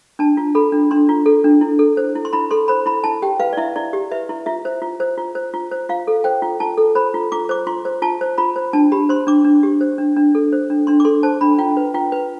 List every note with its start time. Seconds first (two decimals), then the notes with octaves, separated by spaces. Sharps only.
0.19 D4 A5
0.37 F4
0.55 A4 B5
0.72 D4
0.91 D4 C6
1.09 F4
1.26 A4
1.44 D4
1.61 E4
1.79 A4
1.97 C5
2.15 E4
2.25 C6
2.33 E4 B5
2.51 A4 C6
2.68 C5 B5
2.86 E4 B5
3.04 E4 A5
3.22 G4 G5
3.40 B4 F5
3.53 D5
3.57 E4 E5
3.76 E4 D5
3.93 G4
4.11 B4 E5
4.29 E4
4.46 F4 E5
4.65 C5
4.82 F4
5.00 C5
5.18 F4
5.35 C5
5.54 F4
5.71 C5
5.89 F4 F5
6.07 A4
6.24 C5 G5
6.42 F4
6.60 F4 A5
6.77 A4
6.95 C5 B5
7.14 F4
7.32 F4 D6
7.49 C5 D6
7.67 F4 C6
7.85 C5
8.02 F4 A5
8.21 C5
8.38 F4 B5
8.56 C5
8.73 D4 A5
8.92 G4 B5
9.09 C5 C6
9.27 D4 D6
9.45 D4
9.63 G4
9.81 C5
9.98 D4
10.16 D4
10.35 A4
10.53 C5
10.70 D4
10.87 D4 C6
11.00 D6
11.05 A4 C6
11.23 C5 A5
11.41 D4 B5
11.58 F4 G5
11.77 B4
11.94 F4 G5
12.12 B4